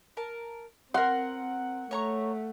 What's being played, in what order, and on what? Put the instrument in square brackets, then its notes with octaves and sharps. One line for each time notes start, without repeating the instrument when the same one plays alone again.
[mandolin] A#4 A5
[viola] C4 [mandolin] A#4 C6 [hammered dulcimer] F#5
[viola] A3 [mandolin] C#5 A#5 C#6